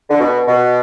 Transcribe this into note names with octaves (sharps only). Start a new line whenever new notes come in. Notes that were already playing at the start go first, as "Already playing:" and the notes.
D3
B2
B2